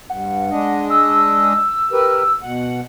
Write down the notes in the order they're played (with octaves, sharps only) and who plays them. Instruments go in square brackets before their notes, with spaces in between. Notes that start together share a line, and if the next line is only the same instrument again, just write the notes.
[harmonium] G2 [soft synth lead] F#5
[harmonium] G#3 D4 D#5
[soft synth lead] E6
[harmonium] G4 A#4 B4
B2 F#5